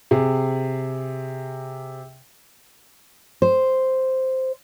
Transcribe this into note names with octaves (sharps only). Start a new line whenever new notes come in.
C3 G#4
C5